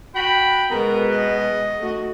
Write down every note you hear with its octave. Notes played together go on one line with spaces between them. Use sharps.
F#4 G5 B5
B2 G#3 B3 A#4
D#5
A3 F#4